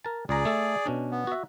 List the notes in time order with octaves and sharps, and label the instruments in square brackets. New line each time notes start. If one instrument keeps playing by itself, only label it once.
[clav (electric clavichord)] A#4 A5
[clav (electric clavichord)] C#2 A#5 [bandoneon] G#4 D5
[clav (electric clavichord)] A3 A4
B2 C#4 D4
[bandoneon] B3
[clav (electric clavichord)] F#4 E5